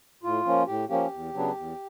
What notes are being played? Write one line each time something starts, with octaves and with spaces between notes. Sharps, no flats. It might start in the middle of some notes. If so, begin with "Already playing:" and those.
A2 F4
F3 A#3 C#4
A2 G4
F3 A#3 C#4 G4
E2
C#3 F#3 B3 D4
E2